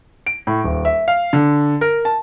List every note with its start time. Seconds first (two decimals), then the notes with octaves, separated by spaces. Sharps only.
0.27 D7
0.47 A2
0.64 D#1
0.85 E5
1.08 F5
1.33 D3
1.81 A#4
2.05 A5